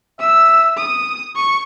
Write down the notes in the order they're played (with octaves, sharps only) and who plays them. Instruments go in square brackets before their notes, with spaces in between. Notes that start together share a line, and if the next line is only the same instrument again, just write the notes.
[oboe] E5 [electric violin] E6
[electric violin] D#6
C#6